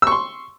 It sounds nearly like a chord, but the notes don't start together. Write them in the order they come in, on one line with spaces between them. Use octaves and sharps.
E6 C#6 C6